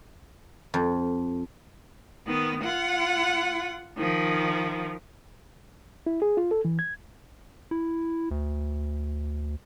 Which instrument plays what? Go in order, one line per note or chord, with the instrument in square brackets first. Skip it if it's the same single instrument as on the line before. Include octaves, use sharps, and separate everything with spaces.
[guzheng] F2
[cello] D#3 B3
F4 F#5
D#3 F3
[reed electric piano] E4
G#4
F4
A4
E3
G#6
[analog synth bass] E4
D2